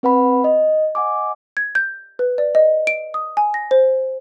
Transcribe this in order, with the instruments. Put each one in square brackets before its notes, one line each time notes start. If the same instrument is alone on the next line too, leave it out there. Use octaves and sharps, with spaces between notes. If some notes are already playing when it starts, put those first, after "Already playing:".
[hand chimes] C4 B4 F#5 B5
D#5
D#5 F#5 G#5 D6
[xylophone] G#6
G6
B4
D5
D#5
D7
D#6
G#5
A#6
C5